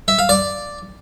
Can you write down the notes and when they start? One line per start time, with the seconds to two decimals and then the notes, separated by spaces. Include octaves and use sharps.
0.08 E5
0.19 F5
0.29 D5